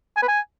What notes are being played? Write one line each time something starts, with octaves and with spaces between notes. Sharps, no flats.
G#5
B4
G#5